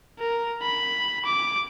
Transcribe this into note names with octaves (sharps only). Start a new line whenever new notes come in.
A#4
B5
D6